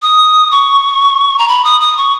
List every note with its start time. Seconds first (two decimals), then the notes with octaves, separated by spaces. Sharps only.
0.02 D#6
0.51 C#6
1.39 A#5
1.48 B5
1.64 D#6
1.81 D#6
1.97 C#6